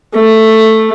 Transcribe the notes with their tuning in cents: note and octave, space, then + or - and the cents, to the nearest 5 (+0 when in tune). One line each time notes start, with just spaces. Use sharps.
A3 +5